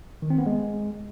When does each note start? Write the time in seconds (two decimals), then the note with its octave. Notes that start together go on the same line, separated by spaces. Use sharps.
0.22 D#3
0.30 C4
0.38 B3
0.46 G#3